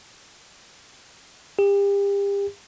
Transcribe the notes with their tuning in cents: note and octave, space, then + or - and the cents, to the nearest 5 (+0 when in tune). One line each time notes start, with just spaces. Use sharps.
G4 +35